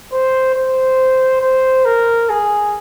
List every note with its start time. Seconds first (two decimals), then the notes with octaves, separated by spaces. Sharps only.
0.12 C5
0.55 C5
1.42 C5
1.85 A#4
2.30 G#4